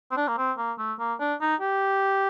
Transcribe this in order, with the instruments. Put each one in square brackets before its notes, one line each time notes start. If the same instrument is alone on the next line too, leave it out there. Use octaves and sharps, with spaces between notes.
[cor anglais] C4
D4
A#3
C4
A#3
A3
A#3
D4
D#4
G4